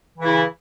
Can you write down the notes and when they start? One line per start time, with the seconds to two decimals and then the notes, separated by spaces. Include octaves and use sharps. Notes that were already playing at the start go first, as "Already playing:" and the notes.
0.18 E3
0.22 C#3
0.25 E4